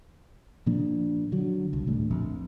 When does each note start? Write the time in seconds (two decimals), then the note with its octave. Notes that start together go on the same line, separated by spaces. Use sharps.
0.66 A#2 F3 A#3 D4
1.32 D3 F#3
1.73 C2
1.87 D#1 D2 A2
2.11 A#1 F2